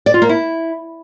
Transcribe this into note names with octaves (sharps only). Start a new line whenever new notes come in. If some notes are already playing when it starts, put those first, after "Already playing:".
D5
F4
A#3
E4